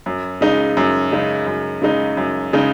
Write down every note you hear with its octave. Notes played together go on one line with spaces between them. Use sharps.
F#2
C#3 G#3 D#4
F#2
C#3 G#3 D#4
F#2
C#3 G#3 D#4
F#2
C#3 G#3 D#4